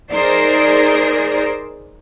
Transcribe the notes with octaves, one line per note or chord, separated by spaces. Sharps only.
D#4 G#4 A#4 C5 D5